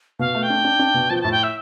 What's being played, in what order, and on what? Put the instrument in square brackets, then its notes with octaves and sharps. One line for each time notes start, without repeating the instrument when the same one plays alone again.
[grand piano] B2 [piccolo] F5
[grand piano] A3
[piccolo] G5
[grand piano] D4
D4
D4
B2
[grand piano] F3 [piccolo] A5
[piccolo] G5
[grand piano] A2 [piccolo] A5
[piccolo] G5
E5